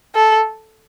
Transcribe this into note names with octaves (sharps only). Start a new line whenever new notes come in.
A4